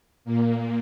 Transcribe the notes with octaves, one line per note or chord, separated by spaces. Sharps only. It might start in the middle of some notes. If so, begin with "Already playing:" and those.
A#2 A#3